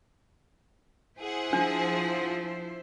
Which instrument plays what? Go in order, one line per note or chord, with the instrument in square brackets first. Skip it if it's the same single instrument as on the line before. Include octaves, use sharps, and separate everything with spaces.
[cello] E4 C5 [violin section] G#4 F#5
[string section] F3 [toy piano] D4